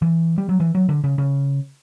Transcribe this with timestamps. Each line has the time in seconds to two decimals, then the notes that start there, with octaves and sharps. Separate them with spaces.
0.02 E3
0.38 G3
0.49 F#3
0.60 E3
0.75 F#3
0.89 D3
1.04 C#3
1.18 C#3